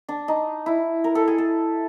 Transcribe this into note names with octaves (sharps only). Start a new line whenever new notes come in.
D4
D#4
E4
A#4
A4
G#4
A4